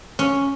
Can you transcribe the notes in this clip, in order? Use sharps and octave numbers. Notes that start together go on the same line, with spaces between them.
C#4